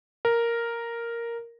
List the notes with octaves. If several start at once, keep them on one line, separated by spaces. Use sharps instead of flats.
A#4